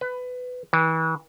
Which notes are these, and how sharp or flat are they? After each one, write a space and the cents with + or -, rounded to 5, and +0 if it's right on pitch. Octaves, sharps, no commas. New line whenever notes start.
B4 +20
E3 -35